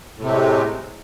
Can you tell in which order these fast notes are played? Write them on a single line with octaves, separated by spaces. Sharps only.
A2 C3 A3 G#3